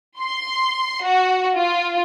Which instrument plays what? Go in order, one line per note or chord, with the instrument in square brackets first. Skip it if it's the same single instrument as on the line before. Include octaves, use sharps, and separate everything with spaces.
[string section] C6
F#4
F4